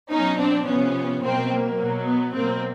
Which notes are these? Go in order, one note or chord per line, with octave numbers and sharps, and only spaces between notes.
B2 F#3 C#4 D#4
C4 D4
C3 F3 B3 C#4
B2 F#3 A#3 C4
A#3
B2 F#3
B3
B2 F#3 A#3 C4